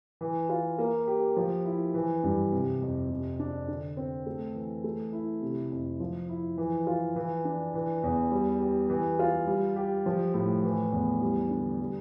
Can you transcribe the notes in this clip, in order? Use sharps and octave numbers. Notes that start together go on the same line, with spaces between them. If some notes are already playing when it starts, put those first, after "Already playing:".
E3
F4
A#3
G4
F3
E4
E3
G2
C3
F2
C3
D4
D3
C4
A3
E3
A3
E4
C3
F2
F3
E4
E3
F4
E3
D4
E3
E2
G3
G4
E3
F4
G3
G4
F3
A2
E3
E2
G3
D3
G3